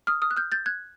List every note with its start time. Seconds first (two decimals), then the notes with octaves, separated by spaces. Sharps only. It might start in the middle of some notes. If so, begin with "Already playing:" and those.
0.07 D#6 F6
0.22 D#6 F6
0.31 F#6
0.37 F6 G6
0.52 G6 A6
0.66 F#6 G#6